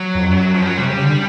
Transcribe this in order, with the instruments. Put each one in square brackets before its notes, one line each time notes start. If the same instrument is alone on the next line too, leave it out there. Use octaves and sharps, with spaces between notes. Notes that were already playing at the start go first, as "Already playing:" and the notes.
Already playing: [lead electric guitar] F#3
[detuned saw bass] F2
F#2
[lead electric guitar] F3
F#3
[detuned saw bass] C3 [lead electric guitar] G3
[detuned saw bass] C#3
D3